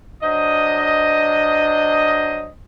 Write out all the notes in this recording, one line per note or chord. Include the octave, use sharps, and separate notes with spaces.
F#3 D4 C5 D#5